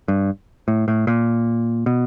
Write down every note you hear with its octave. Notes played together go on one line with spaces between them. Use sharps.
G2
A2
A2
A#2
B2